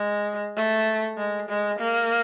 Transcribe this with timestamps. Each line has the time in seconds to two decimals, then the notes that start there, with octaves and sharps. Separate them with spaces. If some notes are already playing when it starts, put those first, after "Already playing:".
Already playing: G#3
0.56 A3
1.17 G#3
1.49 G#3
1.80 A#3